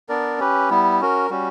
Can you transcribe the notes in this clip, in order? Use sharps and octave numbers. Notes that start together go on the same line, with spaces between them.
B3 D4 A#4 D5
C#4 G4 B4
G3 B3 E4
C#4 F#4 A#4
G3 C#4 F#4